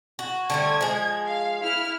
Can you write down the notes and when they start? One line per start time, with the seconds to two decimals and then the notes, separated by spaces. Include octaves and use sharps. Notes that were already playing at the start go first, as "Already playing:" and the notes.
0.19 F#4
0.50 D3 G3 A3 G#6
0.81 F3 G#3
1.26 F5
1.62 E4 F6